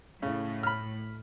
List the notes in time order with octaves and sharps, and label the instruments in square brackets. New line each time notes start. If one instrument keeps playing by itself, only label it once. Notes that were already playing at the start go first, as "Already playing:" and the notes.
[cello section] A2 [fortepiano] C#3
[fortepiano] B5 F6